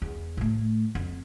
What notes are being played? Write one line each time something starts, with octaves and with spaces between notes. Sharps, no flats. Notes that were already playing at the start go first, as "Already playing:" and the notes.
E2
A2 A3
F2